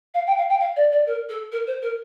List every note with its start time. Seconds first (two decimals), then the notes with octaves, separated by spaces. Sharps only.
0.14 F5
0.27 G5
0.37 F5
0.49 G5
0.60 F5
0.76 D5
0.91 D5
1.06 A#4
1.29 A4
1.52 A#4
1.67 C5
1.82 A#4